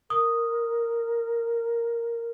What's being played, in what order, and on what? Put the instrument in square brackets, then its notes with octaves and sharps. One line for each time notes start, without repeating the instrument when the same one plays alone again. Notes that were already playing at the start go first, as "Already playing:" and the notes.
[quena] A#4 [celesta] D#6